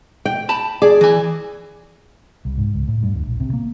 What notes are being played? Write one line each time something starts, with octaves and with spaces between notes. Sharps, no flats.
G5
A5 B5
G#4 D5
E3 G#5
C2
G#2
C#2
A2
G2
D1
A#1
C3
A#3